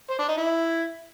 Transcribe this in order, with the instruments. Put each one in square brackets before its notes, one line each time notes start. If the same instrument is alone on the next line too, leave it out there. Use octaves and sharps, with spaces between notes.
[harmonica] C5
D4
D#4
E4